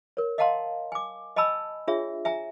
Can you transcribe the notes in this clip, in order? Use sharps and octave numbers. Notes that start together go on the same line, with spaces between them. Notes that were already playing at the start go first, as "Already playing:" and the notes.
A#4 C#5
D#5 F5 F#5 A5 A#5 C6
G#5 D6
D#5 G#5 A5 B5 E6
D4 F4 G#4 C#5 E5
E5 G#5 A#5